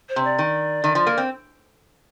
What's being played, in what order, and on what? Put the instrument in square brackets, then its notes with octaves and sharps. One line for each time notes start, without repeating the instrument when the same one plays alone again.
[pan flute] C5
[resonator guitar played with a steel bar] C3
[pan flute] D5
[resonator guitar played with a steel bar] D#3
D#3
F3
A#3
C4